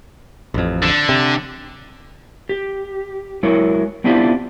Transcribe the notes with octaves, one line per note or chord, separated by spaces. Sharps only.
A1 F2
D3
C3
G4
F#3 G#3 E4 A#4 C#5
B3 C4 D4 E4 F4 G4